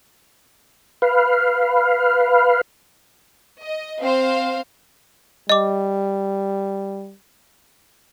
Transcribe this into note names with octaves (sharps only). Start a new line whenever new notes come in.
B4 F5
D#5
C4 C5 F5
G3 D#5 D6